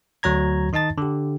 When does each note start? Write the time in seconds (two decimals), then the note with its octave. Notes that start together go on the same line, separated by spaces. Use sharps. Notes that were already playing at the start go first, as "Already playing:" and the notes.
0.23 D2 F#3 C#5 A#5 G#6
0.73 D#3 D#4 D#5 A5 A6
0.98 D3 G4